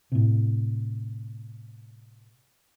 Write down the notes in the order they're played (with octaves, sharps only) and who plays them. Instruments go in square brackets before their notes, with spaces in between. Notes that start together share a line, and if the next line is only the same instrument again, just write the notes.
[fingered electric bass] A2 C3